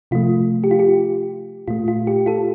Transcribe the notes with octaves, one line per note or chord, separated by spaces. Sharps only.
C3 F3 A3 F4
G4
F4
G4
A#2 A3 F4
F4
G4
F4 A4